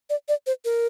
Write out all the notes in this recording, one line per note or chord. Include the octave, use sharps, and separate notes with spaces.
D5
D5
C5
A#4